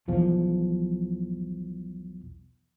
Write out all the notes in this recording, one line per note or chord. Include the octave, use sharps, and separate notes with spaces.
B1 E2 F3